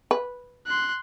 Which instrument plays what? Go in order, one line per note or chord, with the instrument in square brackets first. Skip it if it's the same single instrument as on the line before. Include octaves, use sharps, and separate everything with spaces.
[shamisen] B4
[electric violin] C6 F#6